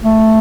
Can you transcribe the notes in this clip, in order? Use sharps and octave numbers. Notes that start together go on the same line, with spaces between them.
A3